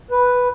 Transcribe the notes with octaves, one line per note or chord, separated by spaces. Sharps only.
B4